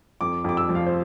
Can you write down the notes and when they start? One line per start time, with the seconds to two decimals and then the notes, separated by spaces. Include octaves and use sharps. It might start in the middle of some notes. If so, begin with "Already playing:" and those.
0.21 F2 D6
0.44 F2 D6
0.57 E6
0.69 F3
0.75 F5
0.86 C5